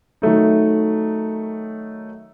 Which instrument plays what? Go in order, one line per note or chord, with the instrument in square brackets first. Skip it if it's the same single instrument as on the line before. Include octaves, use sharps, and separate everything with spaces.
[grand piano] D#3 F#3 A3 D#4